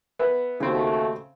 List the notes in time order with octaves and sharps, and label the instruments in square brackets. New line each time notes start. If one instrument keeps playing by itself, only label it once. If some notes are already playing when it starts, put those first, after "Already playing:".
[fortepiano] B3 E5
[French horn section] D#2 A3 F#4 [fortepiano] C#3 C4